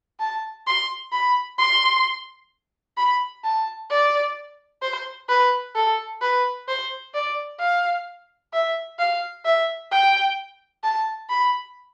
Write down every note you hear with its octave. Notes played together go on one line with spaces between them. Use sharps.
A5
C6
B5
C6
B5
A5
D5
C5
B4
A4
B4
C5
D5
F5
E5
F5
E5
G5
A5
B5